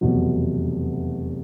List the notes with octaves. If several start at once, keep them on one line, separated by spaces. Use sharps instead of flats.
F1 E2 B2 F#3